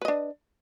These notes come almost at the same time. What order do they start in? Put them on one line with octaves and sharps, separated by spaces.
B4 D#5 D4